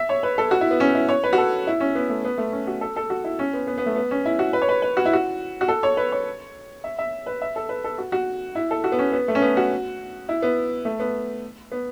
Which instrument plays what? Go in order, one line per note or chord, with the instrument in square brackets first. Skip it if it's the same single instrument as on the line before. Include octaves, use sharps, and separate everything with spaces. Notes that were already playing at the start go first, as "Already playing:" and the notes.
Already playing: [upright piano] E5
C#5
B4
A4
F#4
E4
B3
C#4
E4
C#5
B4
F#4
A4
E4
C#4
B3
A3
B3
A3
C#4
F#4
A4
A4
F#4
E4
C#4
B3
B3
B3
A3
B3
C#4
E4
F#4
B4
C#5
B4
B4
F#4
E4
F#4
F#4
A4
C#5
B4
C#5
E5
E5
B4
E5
A4
B4
A4
F#4
F#4
E4
A4
F#4
B3
C#4
B3
A3
C#4
B3
F#4
E4
B3
A3
B3
B3